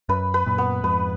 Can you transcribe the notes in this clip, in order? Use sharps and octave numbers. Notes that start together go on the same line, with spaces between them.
F#2 B4
B4
F#2 A#2
B3
F2 G#2 B4